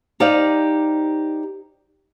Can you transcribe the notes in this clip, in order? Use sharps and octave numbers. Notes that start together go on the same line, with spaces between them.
D#4 G4 C5 D5 D#5 F5